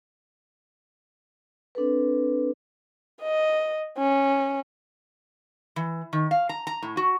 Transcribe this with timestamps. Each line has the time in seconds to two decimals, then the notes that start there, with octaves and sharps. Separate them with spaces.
1.75 C4 D4 A4 B4
3.22 D#5
3.98 C#4
5.76 E3
6.13 D#3
6.31 F5
6.49 A#5
6.67 A#5
6.82 A2
6.97 F#4